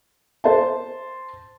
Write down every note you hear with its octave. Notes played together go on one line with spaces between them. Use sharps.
C5 A5